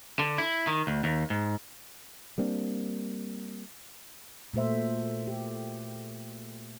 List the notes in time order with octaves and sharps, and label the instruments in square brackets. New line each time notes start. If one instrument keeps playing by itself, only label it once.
[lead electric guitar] D3
E4
D#3
D2
D#2
G#2
[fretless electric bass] G3 A#3 C4 D4
[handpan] A#2 A3 F#4 C5 E5
G4